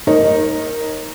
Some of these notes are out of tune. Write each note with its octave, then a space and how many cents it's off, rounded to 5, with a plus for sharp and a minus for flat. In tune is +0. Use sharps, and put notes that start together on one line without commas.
D#4 +0 A#4 +0 C#5 -40